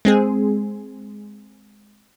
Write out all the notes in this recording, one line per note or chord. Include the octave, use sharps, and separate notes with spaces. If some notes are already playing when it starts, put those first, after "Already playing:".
G#3 C4 G#4